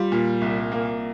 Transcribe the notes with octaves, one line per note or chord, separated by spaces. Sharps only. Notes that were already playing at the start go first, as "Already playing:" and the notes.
Already playing: G3 F4
A#2
C2
A#3